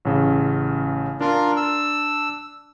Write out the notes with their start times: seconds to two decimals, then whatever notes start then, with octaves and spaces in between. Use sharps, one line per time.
0.05 A1 C#3
1.21 D4 F4 A#4
1.57 E6